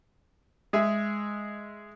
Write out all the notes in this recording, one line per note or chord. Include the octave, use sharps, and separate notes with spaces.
G#3 G#4 E5